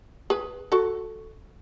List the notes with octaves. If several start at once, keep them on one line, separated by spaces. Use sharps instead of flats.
G#4 B4
F#4 A4